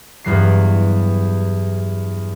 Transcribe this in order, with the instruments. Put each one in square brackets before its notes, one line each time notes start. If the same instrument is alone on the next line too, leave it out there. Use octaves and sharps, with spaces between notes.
[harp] E2 G2 F#3 C7